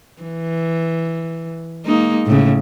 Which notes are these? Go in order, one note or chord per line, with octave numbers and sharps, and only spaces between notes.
E3
G#3 A#3 D#4
A2 C#3